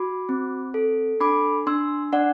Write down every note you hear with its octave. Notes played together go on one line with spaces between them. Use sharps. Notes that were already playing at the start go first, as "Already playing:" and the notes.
Already playing: F#4 B5 D6
C4
A4
D4 B5 D6
D4 C6 E6
D4 D5 F#5